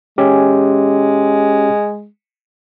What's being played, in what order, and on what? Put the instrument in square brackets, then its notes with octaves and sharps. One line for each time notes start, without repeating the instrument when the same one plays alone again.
[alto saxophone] G#3 [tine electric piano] C#4 G4